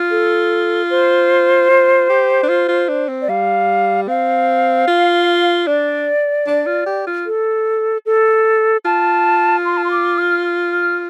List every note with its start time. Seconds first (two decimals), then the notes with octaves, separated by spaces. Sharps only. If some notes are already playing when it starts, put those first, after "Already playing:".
Already playing: F4
0.11 A4
0.90 C5
1.70 F4
2.10 G4
2.43 D4
2.49 F4
2.69 F4
2.89 D4
3.09 C4
3.22 D5
3.28 G3 F5
4.08 C4 F5
4.87 F4
5.67 D4 D5
6.47 D4
6.66 F4
6.86 G4
7.07 F4
7.26 A4
8.06 A4
8.85 F4 A5
9.65 C6
9.77 A5
9.84 C6
9.91 D6
10.18 F6
10.71 F6